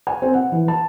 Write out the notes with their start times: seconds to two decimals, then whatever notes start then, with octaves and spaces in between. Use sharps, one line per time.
0.07 G#5
0.22 C4
0.34 F#5
0.52 E3
0.68 A5